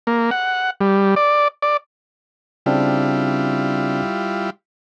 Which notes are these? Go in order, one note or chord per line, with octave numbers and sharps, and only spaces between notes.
A#3
F#5
G3
D5
D5
C#3 G3 C4 D4 E4 F4